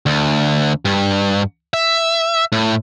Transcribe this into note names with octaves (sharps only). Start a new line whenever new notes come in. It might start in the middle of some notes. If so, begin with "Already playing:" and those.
D2
G2
E5
A2